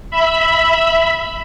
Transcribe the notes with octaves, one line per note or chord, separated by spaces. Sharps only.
E5 B5